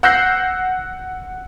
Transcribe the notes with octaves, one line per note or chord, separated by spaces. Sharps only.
F#5 E6 F#6 G6 A#6 C7